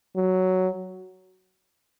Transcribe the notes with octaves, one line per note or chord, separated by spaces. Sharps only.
F#3